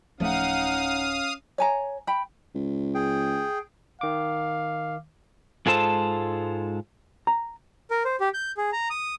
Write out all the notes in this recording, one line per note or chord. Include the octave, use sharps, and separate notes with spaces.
D1 F3 A3 C#4 D#4 F5 F#5 D#6
C#5 G#5 A#5
G5 B5
C#2
G#4 G5
D#3 F5 D6
G#2 G#3 F4 A4 C5 A5
A#5
A#4
C5
G4
G6
G#4
A#5
D#6